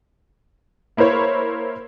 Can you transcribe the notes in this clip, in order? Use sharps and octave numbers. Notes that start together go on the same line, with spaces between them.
A#3 E4 A#4 C5 C#5